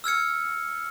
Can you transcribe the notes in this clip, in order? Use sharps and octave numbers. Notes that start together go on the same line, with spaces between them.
E6 F6 G#6 C#7